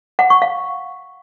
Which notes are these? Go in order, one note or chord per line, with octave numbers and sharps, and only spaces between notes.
F#5
C#6
F5